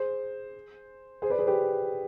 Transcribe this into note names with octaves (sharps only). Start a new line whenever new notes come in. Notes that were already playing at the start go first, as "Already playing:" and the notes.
Already playing: G#4 C5
G#4 C5
B4 D5
G#4 C5
G4 B4